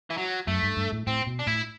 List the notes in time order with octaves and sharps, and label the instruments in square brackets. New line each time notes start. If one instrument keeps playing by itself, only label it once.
[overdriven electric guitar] E3
F#3
[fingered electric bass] F#2 [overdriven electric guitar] A3
[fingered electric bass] G2
G2
A2
[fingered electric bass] A2 [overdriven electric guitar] C4
[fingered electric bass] B2
[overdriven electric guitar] D4
[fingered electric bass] A2 [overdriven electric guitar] E4